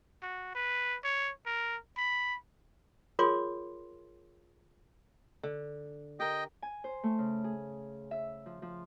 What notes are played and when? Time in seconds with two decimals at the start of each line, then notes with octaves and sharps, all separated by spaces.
0.22 F#4
0.55 B4
1.04 C#5
1.46 A#4
1.97 B5
3.19 F4 G#4 A#4 C#5 C6 D6
5.43 D3
6.20 G4 A#4 D#5 G5
6.62 G#5
6.84 C5
7.03 A3
7.18 C#3
7.44 G#4
8.11 E5
8.46 F3
8.62 F3